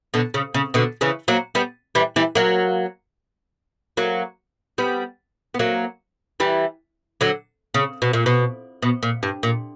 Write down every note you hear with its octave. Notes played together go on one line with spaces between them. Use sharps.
B2 D3
C#3
C#3
B2 D3
C#3 E3
F#3 A#3
G3 B3
E3 G3
E3 G3
F#3 A#3
F#3 A#3
G3 B3
B3
F#3 A#3
E3 G3
D3 F#3
C#3
B2
A#2
B2
B2
A#2
G2
A#2